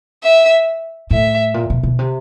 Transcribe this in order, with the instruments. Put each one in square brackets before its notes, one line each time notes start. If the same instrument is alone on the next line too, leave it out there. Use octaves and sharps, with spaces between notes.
[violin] E5
[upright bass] A2 [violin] E5
[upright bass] A#2
B2
B2
C3